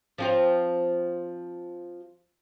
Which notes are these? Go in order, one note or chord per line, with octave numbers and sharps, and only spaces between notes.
F3 C4 F4